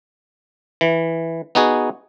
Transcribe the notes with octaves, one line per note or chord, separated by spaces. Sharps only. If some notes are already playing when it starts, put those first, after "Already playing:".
E3
B3 D#4 F#4 G#4